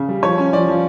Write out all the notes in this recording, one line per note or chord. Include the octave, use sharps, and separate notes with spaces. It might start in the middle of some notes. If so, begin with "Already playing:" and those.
Already playing: C#3
G3
F3 C#5
C#4
F3 D5
F3